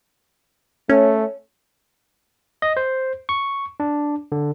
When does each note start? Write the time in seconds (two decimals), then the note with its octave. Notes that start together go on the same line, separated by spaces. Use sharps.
0.89 A3 C#4
2.62 D#5
2.77 C5
3.29 C#6
3.80 D4
4.32 D3